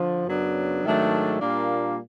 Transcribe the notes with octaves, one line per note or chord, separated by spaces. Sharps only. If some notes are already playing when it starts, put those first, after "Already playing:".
Already playing: D3 F3
F#2 C#3 F#3 B3 D4
G#2 D#3 F#3 A3 D4
A#2 G3 A#3 D4 F4